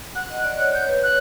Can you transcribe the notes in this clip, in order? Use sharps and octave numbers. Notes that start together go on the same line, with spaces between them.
F#5 F#6
D#5
D5
C#5
C#5 G6
B4
F#6